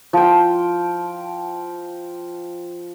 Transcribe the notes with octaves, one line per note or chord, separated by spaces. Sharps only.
F3 G5